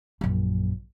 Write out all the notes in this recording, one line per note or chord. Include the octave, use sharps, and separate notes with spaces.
A#1 F#2